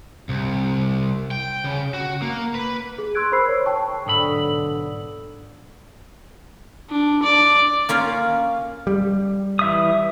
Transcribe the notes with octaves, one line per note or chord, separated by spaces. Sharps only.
C2
G5
C#3
F#4
A#3
B4
G#4
C6 C#6 E6 F#6 G#6 D7
A#4 C5 B5 E6 C7
C#5
C5 G5 A5 C#6
B1 G#2 D3 B5 D#6 E6
D4
D5
A#3 C#4 F4
G3
E3 E5 D#6